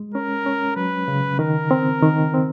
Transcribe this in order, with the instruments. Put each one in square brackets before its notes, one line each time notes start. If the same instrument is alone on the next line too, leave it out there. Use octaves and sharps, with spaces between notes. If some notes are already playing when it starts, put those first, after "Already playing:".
Already playing: [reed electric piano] G#3
[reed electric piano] C#4 [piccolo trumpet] A#4
[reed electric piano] C#4
[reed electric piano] F#3 [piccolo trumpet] B4
[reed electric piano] C#3
[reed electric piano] D#3 [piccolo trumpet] A#4
[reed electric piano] C4
D#3
C4